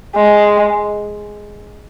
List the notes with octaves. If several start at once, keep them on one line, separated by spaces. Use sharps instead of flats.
G#3